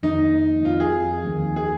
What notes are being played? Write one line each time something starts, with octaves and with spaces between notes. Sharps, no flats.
F2 D#3 A#3 D#4
F2 F3 C4 F4
G#4
D#2 D#3 A#3
G#4